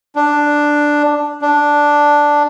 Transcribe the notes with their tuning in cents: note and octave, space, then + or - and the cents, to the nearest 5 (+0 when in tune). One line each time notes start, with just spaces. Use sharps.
D4 +5
D4 +0